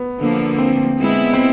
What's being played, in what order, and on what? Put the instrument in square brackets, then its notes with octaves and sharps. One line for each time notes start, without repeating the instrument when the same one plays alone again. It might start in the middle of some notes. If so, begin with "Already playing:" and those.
Already playing: [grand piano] B3
[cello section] D3 F3 A#3
[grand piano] C4
[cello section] G#3 B3 E4
[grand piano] C4